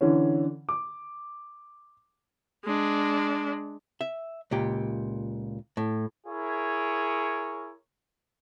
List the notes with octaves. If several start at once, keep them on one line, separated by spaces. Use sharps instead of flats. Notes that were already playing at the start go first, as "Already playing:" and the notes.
D3 E3 C#4
D6
G#3 D4
E5
C#2 A#2 G4
A2
E4 G#4 A#4 C#5